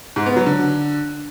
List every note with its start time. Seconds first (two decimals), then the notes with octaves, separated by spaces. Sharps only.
0.16 G#2
0.26 B3
0.36 F#3
0.46 D3